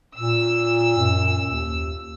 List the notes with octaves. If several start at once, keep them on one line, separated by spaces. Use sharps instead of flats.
A#2 E6
F#2
D#2